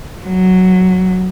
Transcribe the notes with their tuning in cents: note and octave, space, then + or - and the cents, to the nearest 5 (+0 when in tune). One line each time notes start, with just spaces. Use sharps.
F#3 +0